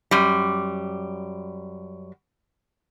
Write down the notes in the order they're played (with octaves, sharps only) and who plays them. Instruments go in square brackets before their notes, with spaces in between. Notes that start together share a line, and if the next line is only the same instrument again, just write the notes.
[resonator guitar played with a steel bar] F#2 G3